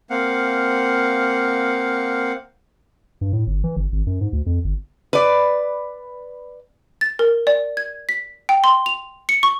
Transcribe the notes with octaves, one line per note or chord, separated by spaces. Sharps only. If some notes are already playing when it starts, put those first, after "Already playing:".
A#3 C4 F5 F#5
G2
A2
G1
E3
G1
G#1
F#2
G#2
D2
F2
G1
B4 D5
A6
A#4
D5
G#6
B6
G5
C6
F7
C#7
C#6